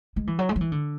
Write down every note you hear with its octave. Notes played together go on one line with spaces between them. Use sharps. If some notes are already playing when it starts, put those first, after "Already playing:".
G#3
E3
F#3
G#3
F#3
E3
D3